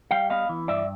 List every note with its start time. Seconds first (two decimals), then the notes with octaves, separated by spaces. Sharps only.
0.11 G3 F5 G5
0.30 B3 D#5 F5
0.49 E3
0.68 G2 D5 E5